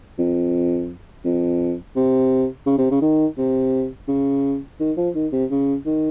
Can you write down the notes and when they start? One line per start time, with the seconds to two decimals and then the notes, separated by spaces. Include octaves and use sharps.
0.18 F2
1.24 F2
1.96 C3
2.66 C#3
2.78 C3
2.91 C#3
3.02 D#3
3.38 C3
4.08 C#3
4.80 D#3
4.97 F3
5.15 D#3
5.33 C3
5.51 C#3
5.86 D#3